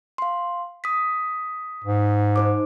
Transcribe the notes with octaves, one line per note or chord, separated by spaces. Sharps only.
F5 C6
D#6 B6
G#2
D#4 C5 D6